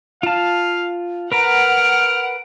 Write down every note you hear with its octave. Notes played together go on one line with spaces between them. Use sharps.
F4 F5 A5
A#4 B4 F#5 A#5 F6 D7